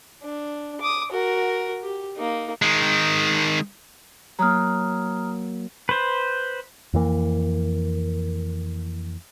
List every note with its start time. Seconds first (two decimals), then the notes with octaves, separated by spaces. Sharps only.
0.23 D4
0.81 D6 D#6
1.12 F#4 A#4
1.83 G4
2.17 A#3 D#4
2.62 D#3 G#3
4.39 F#3 A#3 A#5 D#6 F6
5.89 B4 C5
6.94 F2 E3 A#3